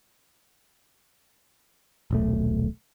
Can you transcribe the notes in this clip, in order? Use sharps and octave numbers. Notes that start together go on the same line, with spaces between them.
D#1 B1 A3